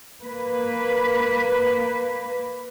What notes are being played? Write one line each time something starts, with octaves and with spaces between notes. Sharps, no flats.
A#3 B4